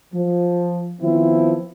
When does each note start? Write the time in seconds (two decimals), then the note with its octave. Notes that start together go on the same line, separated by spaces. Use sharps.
0.14 F3
1.02 D#3 F3 B3 C4 E4